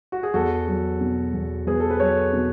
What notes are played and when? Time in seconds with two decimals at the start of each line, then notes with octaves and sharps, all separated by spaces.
0.12 F#4
0.23 G#4
0.34 E2 F#4 A4
0.68 F#3
1.01 B2
1.34 E2
1.66 E2 G#4 B4
1.80 A4
1.90 B4
2.00 F#3 A4 C#5
2.33 B2